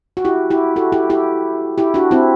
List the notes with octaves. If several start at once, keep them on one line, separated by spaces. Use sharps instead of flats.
F#4
E4 G4
E4 G4
F#4 A4
E4 G4
E4 G4
E4 G4
D4 F#4
C4 E4